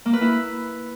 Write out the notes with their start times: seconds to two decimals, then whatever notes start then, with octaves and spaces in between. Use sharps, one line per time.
0.06 A#3
0.13 B4
0.21 E4